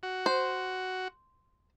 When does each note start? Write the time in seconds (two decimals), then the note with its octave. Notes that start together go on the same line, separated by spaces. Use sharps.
0.03 F#4
0.26 C5